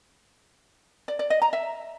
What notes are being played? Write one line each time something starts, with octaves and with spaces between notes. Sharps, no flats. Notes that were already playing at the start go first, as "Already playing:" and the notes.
D5
D5
D#5
A#5
E5